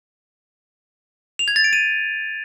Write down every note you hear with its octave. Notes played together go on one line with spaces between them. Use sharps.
F7
G#6
A6
D7
D#7